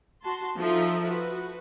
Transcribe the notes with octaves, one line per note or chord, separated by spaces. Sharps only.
F#4 A5 C6
F3 D#4 A4 E5
F#4 B4